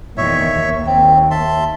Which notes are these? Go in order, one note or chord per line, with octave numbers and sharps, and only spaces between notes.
E2 A#2 D#3 C#5 E5
D#2
C4
E5 A5 C6